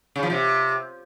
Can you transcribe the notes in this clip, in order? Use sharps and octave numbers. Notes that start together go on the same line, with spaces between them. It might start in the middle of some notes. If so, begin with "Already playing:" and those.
C#3
F3
C3